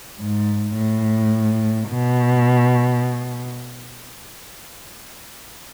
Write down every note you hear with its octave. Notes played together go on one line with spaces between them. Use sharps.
G#2
A2
B2